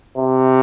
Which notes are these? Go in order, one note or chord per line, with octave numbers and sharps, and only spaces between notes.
C3